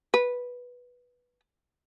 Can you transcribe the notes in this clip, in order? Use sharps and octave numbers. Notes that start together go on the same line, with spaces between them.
B4